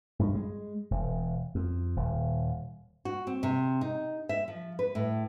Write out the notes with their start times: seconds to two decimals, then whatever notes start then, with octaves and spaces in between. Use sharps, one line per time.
0.19 G2
0.34 G#3
0.91 E1
1.55 F2
1.96 D#1
3.05 F#4
3.27 C4
3.43 C3
3.81 D#4
4.29 E5
4.48 F3
4.79 B4
4.95 A2